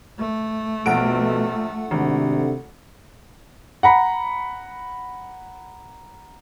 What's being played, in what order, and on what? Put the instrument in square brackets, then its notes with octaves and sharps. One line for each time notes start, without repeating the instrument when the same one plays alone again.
[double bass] A3
[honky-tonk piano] A#1 D7 [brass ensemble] B2 [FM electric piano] A4 F#5
[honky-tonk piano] G#1 [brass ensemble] C3 D4
[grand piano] F#5 A#5 B5